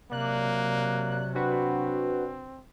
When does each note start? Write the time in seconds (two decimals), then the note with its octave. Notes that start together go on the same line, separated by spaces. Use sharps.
0.11 C3 F#3 A#3 D5 F#6
1.35 C4 D4 F#4 B4